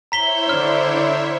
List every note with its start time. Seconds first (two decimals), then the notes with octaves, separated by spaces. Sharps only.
0.12 E4 C5 C#5 E5 A#5 B6 G7
0.49 D3 D4 F6